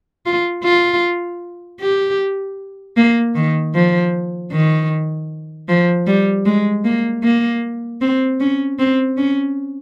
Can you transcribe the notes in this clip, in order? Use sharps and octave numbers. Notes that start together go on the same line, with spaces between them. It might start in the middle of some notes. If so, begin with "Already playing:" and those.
F4
F4
G4
A#3
D#3
F3
D#3
F3
G3
G#3
A#3
A#3
C4
C#4
C4
C#4